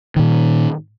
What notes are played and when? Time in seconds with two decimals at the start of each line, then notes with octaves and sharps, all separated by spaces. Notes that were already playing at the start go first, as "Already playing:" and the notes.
0.16 A#2 D#3